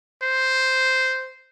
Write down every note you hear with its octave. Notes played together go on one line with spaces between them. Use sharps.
C5